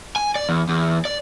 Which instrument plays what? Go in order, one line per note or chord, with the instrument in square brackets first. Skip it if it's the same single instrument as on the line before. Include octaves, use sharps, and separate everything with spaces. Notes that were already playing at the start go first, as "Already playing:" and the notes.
[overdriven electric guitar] G#5
D5
E2
E2
D5